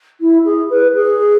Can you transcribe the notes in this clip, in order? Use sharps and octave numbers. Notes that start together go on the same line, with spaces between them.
E4
G#4
B4
G#4